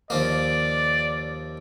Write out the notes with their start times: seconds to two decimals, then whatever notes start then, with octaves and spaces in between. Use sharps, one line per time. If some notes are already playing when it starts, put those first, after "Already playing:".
0.10 D#2 F3 A#3 D5